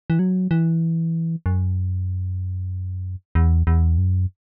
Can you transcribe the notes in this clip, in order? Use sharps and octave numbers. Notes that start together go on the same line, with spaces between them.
E3
F#3
E3
F#2
E2
E2
F#2